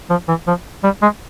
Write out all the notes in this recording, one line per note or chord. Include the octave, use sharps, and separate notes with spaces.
F3
E3
F3
G3
G#3